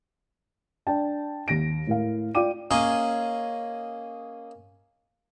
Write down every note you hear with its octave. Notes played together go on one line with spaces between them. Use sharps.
D4 G5 A5
D#2 A#6 D7
A2 A#4 F5
F4 D5 F5 G5 D6 D#7
A#3 C#4 G#4 D#5